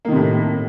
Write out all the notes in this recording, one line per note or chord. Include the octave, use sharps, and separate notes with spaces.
A2 C3 D#3 A#3